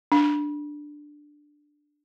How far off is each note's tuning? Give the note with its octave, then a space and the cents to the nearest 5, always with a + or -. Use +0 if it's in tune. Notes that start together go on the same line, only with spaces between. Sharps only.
D4 +5